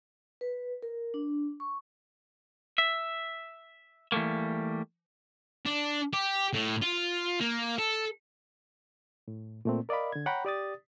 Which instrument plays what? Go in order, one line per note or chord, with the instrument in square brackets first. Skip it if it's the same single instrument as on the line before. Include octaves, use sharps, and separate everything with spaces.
[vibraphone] B4
A#4
D4
C#6
[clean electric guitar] E5
E3 G3 A3 A#3
[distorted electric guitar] D4
G4
A2
F4
A#3
A4
[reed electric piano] A2
A#2 A3 C4
A#4 D5 D#5 F5 B5
D3 G#6
C#5 F#5 G5 A#5 B5
G4 D5 D#6 A6